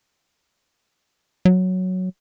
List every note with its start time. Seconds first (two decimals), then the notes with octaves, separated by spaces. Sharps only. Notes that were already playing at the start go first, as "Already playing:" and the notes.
1.45 F#3